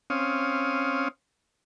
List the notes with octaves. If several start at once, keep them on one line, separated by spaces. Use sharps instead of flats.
C4 C#4 F5 D#6